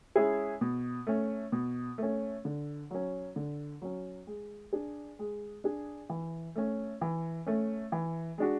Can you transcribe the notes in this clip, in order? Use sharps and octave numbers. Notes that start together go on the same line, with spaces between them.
G#3 C#4 E4 G#4
B2
A3 C#4
B2
A3 C#4
D3
F#3 C#4
D3
F#3 C#4
G#3
D4 G#4
G#3
D4 G#4
E3
A3 C#4
E3
A3 C#4
E3
G#3 D4 F#4